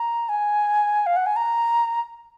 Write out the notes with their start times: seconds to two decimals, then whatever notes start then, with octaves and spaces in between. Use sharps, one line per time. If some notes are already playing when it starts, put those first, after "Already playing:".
Already playing: A#5
0.29 G#5
1.06 F5
1.16 F#5
1.26 G#5
1.36 A#5